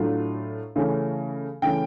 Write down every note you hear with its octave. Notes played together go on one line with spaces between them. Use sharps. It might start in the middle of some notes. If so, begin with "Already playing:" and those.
Already playing: A2 F#3 A3 D4 F4
C#3 E3 A3 C#4
C#3 E3 A3 C#4 G5